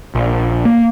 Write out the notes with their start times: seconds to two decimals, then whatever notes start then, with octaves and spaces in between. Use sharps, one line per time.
0.15 A#1
0.65 A#3